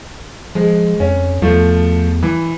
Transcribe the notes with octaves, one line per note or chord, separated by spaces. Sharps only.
F3 G#3
F2 C#4
E2 F3 A3
E3